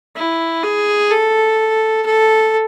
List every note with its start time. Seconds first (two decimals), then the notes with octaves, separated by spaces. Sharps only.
0.16 E4
0.63 G#4
1.11 A4
2.06 A4